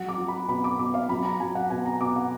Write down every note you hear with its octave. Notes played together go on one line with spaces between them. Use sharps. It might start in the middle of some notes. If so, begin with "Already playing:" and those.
Already playing: F#3 F#5
D6
F#3
B5
B2 B5
D6
B2 D6
F5
F#3 B5
A#5
F#3 G#5
F#5
B2 G#5
A#5
B2 D6
F#5